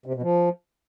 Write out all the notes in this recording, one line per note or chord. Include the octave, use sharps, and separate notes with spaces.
C3
B2
F3